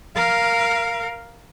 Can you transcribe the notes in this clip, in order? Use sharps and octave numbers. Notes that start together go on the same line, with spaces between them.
A#4 F5